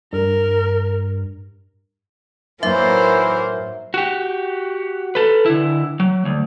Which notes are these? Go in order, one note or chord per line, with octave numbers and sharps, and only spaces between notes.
G2 A#4
A2 E3 F#3 A#3 D#4 A#4 C5 E5
F#4 G4
A4 B4
D3 E4
F#3
D2